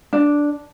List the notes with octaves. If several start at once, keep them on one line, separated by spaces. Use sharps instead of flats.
D4